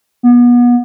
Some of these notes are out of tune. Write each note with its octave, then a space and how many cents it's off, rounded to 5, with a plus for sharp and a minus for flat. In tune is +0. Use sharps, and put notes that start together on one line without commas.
B3 -30